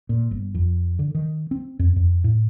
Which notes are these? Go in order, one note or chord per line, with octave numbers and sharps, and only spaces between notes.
A#2
G1
F2
D3
D#3
C4
F2
F2
A2